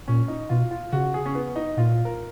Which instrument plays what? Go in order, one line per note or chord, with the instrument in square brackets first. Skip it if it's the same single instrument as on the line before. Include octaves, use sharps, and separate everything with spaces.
[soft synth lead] A#2 [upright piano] C#4
[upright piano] D#4
[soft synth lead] B2 [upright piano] F4
[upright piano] F4
[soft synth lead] C#3 [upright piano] F#4
[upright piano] G#4
C#4
B3
D#4
[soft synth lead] A#2 [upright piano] F4
[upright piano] A#4